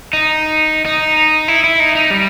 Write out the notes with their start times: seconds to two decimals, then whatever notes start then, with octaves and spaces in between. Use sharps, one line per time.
0.13 D#4
0.86 D#4
1.48 E4
1.64 E4
1.80 D#4
1.95 D#4
2.11 G3